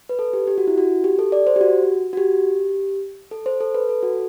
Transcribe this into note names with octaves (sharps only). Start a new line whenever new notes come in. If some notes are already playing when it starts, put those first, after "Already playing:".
B4
A4
G4
G4
F#4
E4
F#4
G4
A4
D5
C5
G4
F#4
F#4
G4
A4
C5
A4
B4
A4
F#4